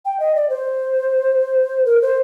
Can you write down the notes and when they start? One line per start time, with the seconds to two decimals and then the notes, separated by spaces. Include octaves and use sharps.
0.05 G5
0.20 D#5
0.35 D5
0.50 C5
1.86 A#4
2.02 C5